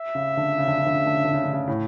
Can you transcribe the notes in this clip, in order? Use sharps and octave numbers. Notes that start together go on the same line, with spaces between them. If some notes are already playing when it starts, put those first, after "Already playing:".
Already playing: E5
C#3
D3
C#3
D3
C#3
D3
C#3
D3
C#3
D3
C#3
D3
C#3
A2